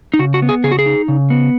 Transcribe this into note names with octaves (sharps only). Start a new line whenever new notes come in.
D#4
C#3 F#4
F#4
B3
G#4
C#3 G#4
F#4
G#4
D#4
C#3
B3